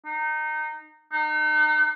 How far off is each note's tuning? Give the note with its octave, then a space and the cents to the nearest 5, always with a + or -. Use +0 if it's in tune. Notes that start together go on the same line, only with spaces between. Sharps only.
D#4 -20
D#4 -30